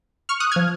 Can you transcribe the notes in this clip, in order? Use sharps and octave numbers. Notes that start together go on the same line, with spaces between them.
C#6 F6
D#6 F#6
F3 F6 G#6